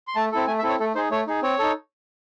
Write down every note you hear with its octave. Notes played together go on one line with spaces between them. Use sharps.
C6
A3 A5
C4 E4 A4
A3 G#5
E5
C4 E4 A4
C#5
A3 A4
D#4 G#4 C5
A3 C#5
D#4 G#4
C4 C#5
D#4 A4